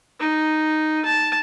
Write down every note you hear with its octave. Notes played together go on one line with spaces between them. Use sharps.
D#4
A5